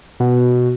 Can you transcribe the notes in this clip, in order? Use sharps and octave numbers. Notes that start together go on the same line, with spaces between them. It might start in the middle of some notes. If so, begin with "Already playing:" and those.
B2